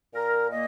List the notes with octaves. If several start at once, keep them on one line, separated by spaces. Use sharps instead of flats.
A#2 A#4
A#3 D#5